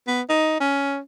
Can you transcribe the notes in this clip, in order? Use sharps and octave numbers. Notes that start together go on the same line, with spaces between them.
B3
D#4
C#4